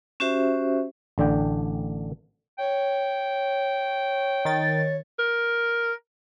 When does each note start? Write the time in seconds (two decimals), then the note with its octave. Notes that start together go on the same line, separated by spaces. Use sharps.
0.20 C#4 F#4 G4 C5 E5
1.18 A1 D3 D4 G5
2.58 C#5 G5
4.45 D#3 A6
5.19 A#4